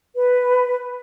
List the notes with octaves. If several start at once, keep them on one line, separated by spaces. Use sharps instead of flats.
B4